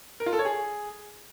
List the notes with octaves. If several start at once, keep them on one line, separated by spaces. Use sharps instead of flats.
A#4
F4
A4
C#5
G#4